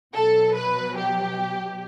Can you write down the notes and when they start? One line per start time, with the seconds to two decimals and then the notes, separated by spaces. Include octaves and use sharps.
0.14 B2 F#3 A4
0.56 B4
0.97 G4